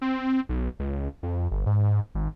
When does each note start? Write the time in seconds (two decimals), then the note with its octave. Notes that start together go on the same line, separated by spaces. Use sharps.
0.01 C4
0.49 B1
0.79 C#2
1.23 F2
1.51 G1
1.66 G#2
2.15 G#1